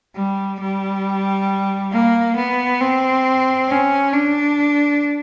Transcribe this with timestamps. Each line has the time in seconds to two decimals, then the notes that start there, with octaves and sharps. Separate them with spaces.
0.16 G3
0.60 G3
1.92 A#3
2.36 B3
2.81 C4
3.68 C#4
4.13 D4